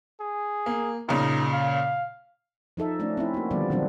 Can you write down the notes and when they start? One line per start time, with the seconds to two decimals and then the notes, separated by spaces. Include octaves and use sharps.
0.21 G#4
0.66 A#3
1.09 A#2 C#3 D#4
1.54 F5
2.77 F3 D#4 A4 E5
3.00 A3 C#4 D4
3.17 C4 C#4 E4
3.34 A#3 F#4
3.51 D3 D#3 F3 G3 B3 D5
3.70 B2 D#3 F#3 C4 D4